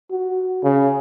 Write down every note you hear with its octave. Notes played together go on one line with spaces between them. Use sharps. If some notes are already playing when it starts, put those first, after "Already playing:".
F#4
C#3